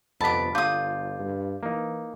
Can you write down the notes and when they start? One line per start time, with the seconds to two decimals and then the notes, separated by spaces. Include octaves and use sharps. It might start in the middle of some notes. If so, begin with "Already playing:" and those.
0.21 G1 F2 C3 B3 A5 B5 D6 B6
0.55 D3 F4 D6 D#6 G6
1.19 G2
1.63 E3 A#3 D#4